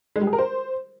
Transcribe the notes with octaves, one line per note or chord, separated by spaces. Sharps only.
G#3
G3
G#4
A#4
C5